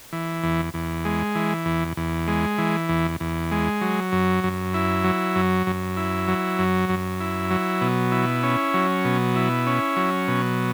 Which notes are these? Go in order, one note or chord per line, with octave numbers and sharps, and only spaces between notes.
E3
E2
E2
G#3
E3
E2
E2
G#3
E3
E2
E2
G#3
F#3
F#2
F#2
E4
F#3
F#2
F#2
E4
F#3
F#2
F#2
E4
F#3
B2
E4
C#4
F#3
B2
E4
C#4
F#3
B2